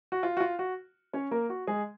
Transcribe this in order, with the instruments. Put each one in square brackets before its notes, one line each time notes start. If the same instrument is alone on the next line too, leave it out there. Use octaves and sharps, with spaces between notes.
[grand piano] F#4
F4
F#4
F4
F#4
C#4 C#5
A#3 A#4
F#4
G#3 G#4